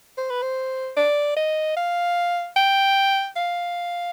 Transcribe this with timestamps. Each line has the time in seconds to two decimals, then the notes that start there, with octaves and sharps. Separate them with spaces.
0.18 C5
0.30 B4
0.42 C5
0.97 D5
1.36 D#5
1.77 F5
2.56 G5
3.36 F5